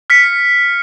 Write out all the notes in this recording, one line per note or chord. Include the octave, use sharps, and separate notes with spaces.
F6 B6 C#7